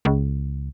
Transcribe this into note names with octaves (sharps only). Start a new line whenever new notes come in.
C#2